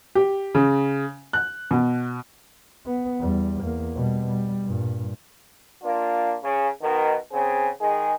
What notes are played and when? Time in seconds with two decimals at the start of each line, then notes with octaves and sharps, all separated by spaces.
0.15 G4
0.55 C#3
1.33 F#6
1.71 B2
2.86 B3
3.19 E2 G3
3.62 E2 A#3
3.95 B2 G3
4.27 G3
4.65 G2 A#2
5.83 A#3 D4 F4
6.43 C#3
6.81 B2 D#3
7.32 C#3 C4 G#4
7.81 D#3 G#3 G#4